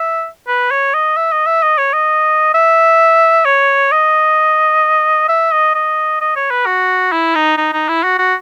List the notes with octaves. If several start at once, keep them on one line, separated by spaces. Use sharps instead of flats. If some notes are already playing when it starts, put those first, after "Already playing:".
Already playing: E5
B4
C#5
D#5
E5
D#5
E5
D#5
C#5
D#5
E5
C#5
D#5
E5
D#5
D#5
D#5
C#5
B4
F#4
E4
D#4
D#4
D#4
E4
F#4
F#4